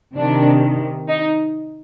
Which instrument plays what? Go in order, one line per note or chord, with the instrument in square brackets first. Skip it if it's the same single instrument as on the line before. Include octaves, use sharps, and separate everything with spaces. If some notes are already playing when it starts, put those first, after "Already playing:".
[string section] C3 D#3 D4
D#4